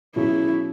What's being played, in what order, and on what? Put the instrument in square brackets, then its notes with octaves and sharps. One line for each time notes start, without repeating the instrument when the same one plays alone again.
[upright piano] B2 F#3 C#4 G#4 E5 [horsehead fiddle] E4